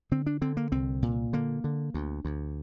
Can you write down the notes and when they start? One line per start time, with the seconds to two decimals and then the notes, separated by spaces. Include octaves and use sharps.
0.12 D3 C4
0.26 D4
0.41 D3 C4
0.57 A#3
0.72 C2 C4
1.03 A#2
1.33 D3 A#3
1.64 D3
1.94 D2
2.25 D2